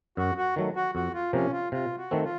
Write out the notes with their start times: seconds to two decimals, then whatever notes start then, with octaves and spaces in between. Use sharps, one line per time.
0.17 F#2 F#4
0.37 F#4
0.56 D#3 F#3 A3
0.76 F#4
0.95 F2 F#4
1.14 F4
1.33 C3 F3 A#3 C#4
1.52 F4
1.72 C3 F4
1.98 F#4
2.11 D#3 A3 C4
2.24 F4